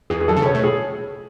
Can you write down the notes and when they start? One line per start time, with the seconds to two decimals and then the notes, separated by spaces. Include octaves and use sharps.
0.10 E2 G#4
0.21 G#4
0.28 F#2 A4
0.37 C#3
0.42 B2 C#5
0.55 A2
0.64 G#4